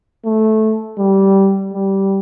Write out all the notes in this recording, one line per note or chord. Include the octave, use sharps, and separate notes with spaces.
A3
G3
G3